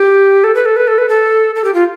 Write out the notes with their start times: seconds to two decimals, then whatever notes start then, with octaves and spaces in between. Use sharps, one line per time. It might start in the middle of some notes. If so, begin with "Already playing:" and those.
Already playing: G4
0.44 A4
0.55 B4
0.66 A4
0.76 B4
0.88 A4
0.98 B4
1.09 A4
1.55 A4
1.64 G4
1.74 F4